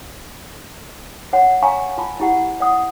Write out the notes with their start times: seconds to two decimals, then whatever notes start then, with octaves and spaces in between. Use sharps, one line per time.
1.33 C#5 F#5
1.62 C#5 F5 G#5 A#5 C#6
1.98 F4 A5 B5
2.20 E4 G4 F#5
2.60 D5 F#5 D#6